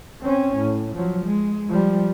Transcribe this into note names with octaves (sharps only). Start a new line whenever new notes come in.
C4 C#4
A2
F3 F#3
G#3
F3 G3